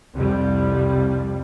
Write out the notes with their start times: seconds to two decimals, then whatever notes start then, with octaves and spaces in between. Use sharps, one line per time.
0.13 C2 F2 G3